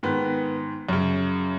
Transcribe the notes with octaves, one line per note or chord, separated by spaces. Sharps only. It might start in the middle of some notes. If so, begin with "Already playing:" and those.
G#2 D#3 B3
F#2 C#3